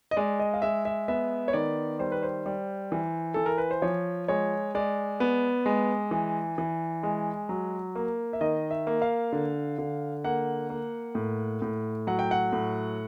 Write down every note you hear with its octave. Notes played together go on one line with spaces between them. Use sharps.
D#5
G#3 D5
D#5
F5
G#3 E5
E5
B3 E5
C#5
D#3 D5
G3 C5
B4
C5
G3
E3
E3 A4
A#4
B4
C5
F3 C#5
G#3 C#5
G#3 D5
B3
G#3
E3
E3
G#3
F#3
A#3
E5
D#3 D#5
E5
A#3
F5
D3
D3
A#3 F#5
A#3
A2
A2
F#3 F#5
G5
F#5
A2